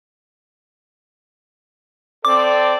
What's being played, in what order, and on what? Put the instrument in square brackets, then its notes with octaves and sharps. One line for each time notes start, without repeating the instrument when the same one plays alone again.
[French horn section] C4 A4 D5 [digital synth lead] D6